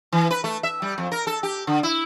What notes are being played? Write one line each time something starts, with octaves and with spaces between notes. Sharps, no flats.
E3
B4
A3
E5
G3
F2
A#4
A4
G4
D3
E4